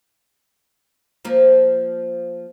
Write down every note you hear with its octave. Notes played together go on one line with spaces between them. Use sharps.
F3 A#3